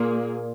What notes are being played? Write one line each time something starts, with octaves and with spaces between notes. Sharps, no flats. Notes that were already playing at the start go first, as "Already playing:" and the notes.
Already playing: A#2 A#3 G#4